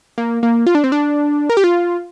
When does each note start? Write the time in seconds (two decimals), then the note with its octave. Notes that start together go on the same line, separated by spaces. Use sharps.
0.18 A#3
0.43 A#3
0.67 F4
0.75 D4
0.84 C4
0.92 D4
1.50 A#4
1.57 G4
1.64 F4